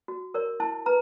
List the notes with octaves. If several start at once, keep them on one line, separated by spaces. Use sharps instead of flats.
F#4
A#4 C#5
E4 A5
B4 A#5